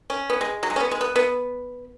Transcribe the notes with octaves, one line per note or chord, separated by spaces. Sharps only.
C#4
B3
G#3
F#3
G#3
C#4
B3
G#3
B3
B3